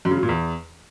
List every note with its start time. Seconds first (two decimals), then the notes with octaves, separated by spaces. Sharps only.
0.05 F#2
0.11 C#3
0.17 F#3
0.23 A#2
0.29 E2